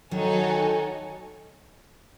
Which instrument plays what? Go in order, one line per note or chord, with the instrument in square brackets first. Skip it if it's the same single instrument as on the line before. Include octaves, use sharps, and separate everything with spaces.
[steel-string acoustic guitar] D#3 F#3 [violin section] D#4 F#4 A4 C#5 G#5